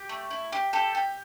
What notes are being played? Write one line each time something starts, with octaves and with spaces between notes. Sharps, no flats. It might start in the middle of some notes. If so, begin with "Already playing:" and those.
Already playing: G4
A3
E4
G4
G4 A4
G4